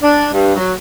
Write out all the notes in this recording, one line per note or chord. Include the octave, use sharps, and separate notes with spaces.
D4
G2
F#3